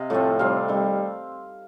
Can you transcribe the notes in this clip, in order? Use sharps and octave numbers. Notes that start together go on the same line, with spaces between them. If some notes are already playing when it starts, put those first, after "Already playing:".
Already playing: C3 D#5 F5
A2 F3 A3 C4
C3 G3 C4 F5
D#3 G3